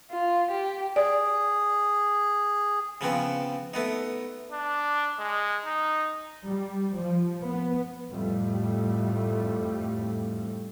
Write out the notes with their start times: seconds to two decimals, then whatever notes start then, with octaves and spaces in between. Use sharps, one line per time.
0.10 F4
0.51 G4
0.96 G#4 D5
3.01 C#3 F3 B3 C4
3.74 A3 B3 D#4
4.52 D4
5.19 G#3
5.65 D#4
6.46 G3
6.98 F3
7.44 B3
8.12 F2 A2 G3 A3